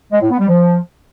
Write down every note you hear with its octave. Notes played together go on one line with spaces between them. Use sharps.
G#3
A2
B3
G3
F3